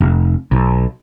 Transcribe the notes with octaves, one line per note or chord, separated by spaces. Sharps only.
F1
B1